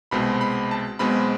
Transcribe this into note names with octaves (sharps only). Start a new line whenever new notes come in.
C2 B2 G#3 C4 B5
B5
A5
B1 B2 G#3 C4 B5